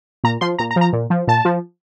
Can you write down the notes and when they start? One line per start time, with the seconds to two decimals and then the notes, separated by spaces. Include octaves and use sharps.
0.24 A#2 A#5
0.41 F3 C6
0.58 A#2 A#5
0.71 A#5
0.76 F3
0.81 A#5
0.93 A#2
1.10 F3
1.28 A#2 A5
1.45 F3